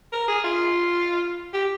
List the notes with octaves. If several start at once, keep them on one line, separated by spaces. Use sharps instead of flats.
A#4
G#4
F4
G4